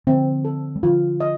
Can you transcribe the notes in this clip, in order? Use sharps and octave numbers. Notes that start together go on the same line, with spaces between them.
D3 F3 C4
A4
G3
D3 F3 F4
D#5